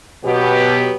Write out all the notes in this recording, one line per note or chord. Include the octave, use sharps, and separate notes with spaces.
B2 F#3 B3 G4